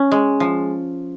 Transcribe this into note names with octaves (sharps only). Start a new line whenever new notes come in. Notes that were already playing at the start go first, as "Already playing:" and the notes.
Already playing: C#4
G#3
F3